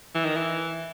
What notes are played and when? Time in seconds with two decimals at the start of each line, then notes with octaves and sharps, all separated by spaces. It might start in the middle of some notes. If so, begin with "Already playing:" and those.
0.15 E3
0.25 D#3
0.36 E3